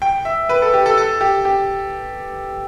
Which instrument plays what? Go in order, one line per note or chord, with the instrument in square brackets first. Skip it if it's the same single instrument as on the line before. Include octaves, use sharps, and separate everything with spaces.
[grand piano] G5
E5
B4
A4
G4
A4
A4
G4
G4